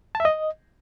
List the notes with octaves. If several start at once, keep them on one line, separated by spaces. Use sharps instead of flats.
A5
E5
D#5